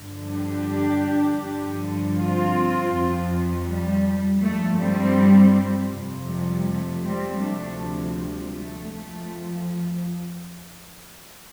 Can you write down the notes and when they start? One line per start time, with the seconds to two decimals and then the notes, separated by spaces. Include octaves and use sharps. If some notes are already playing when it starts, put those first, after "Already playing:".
Already playing: G2 D3 F3
0.29 D4 G4
1.42 G2 D3 F3
2.17 C4 F4
2.91 F2 F3
3.67 G3
4.41 G2 F3 A3
4.79 G3 C4
5.91 F2 C3 F3
6.28 G3
6.66 A3
7.04 G3 C4
7.41 D2 C3 F3 A3 D4
8.16 G3
8.53 A3
8.91 F2 F3 A3